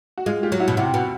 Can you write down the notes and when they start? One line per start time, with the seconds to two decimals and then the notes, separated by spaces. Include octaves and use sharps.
0.18 F#4
0.26 G#3 F4
0.43 F4 G4
0.52 F#3
0.60 E4 F#4
0.68 B2
0.77 C3 E4 F#4
0.94 B2